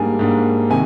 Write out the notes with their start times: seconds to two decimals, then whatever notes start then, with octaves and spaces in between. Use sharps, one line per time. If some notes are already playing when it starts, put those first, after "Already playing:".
Already playing: G#2 G3 A#3 D4 G#5
0.19 G#2 G3 A#3 D4
0.70 C3 D#3 G#5